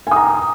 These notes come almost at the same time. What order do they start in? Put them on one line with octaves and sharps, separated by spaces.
G#5 D#6 A#5